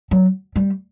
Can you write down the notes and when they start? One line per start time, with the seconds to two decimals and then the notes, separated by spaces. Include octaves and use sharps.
0.11 F#3
0.56 G3